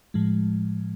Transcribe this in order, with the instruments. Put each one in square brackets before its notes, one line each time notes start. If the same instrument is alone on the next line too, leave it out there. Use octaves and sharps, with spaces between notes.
[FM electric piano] A2 F3 G#3